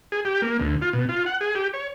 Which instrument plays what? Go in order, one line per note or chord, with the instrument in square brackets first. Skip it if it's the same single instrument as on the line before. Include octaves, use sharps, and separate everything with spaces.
[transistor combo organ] G#4
G4
A#3
D2
F4
B2
F4
F#5
G#4
G4
C#5